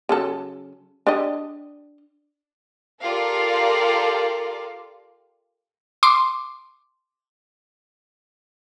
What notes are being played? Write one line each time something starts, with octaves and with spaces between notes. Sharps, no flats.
C#3 F#3 A4
D4 G4 D#5
F4 G4 A4 A#4 D5 F5
C6 D6